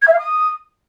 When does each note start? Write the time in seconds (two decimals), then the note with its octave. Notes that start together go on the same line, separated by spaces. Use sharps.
0.02 G#6
0.07 E5
0.13 F5
0.18 D#6